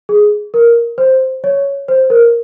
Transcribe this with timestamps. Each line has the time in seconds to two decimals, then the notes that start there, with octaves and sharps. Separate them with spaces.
0.09 G#4
0.54 A#4
0.98 C5
1.44 C#5
1.88 C5
2.10 A#4